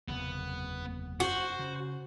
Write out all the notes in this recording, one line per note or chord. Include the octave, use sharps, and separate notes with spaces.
F#1 E2 C3 B3
F#4 C5
C#3